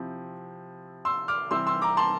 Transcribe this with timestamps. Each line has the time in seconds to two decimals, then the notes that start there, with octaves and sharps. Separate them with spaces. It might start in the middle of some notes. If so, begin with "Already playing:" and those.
Already playing: C3 F3 C4 E4
1.05 C6 E6
1.28 D6 F6
1.51 C3 E3 G3 C4 E4 C6 E6
1.67 C6 E6
1.82 A#5 D6
1.97 A5 C6